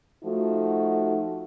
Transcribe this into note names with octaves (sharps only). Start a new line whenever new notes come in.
F3 A3 D#4 F#4